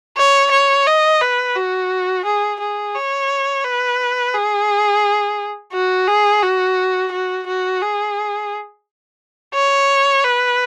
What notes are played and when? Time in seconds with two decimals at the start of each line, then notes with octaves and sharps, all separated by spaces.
0.17 C#5
0.51 C#5
0.87 D#5
1.21 B4
1.55 F#4
2.25 G#4
2.60 G#4
2.95 C#5
3.64 B4
4.34 G#4
5.73 F#4
6.08 G#4
6.43 F#4
7.12 F#4
7.47 F#4
7.82 G#4
9.55 C#5
10.24 B4